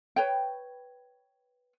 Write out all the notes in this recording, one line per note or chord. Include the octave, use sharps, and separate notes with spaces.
B4 C#5 G5